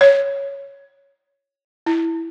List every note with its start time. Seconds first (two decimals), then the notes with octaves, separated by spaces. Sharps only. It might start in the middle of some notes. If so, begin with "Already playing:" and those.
0.01 C#5
1.86 E4